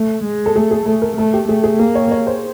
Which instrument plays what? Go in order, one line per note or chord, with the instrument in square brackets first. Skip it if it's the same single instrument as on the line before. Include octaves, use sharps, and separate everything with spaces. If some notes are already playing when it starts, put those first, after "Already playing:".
Already playing: [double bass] A3
G#3
[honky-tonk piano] A4
[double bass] A3 [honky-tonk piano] G#4
[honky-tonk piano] G#4
[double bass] A3 [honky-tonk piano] A4
[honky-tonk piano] A#4
[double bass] A3 [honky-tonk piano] A4
[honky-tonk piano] G4
[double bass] A3 [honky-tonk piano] G#4
[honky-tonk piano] G#4
[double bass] A#3 [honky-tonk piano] G#4
[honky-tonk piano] C#5
C#5
C5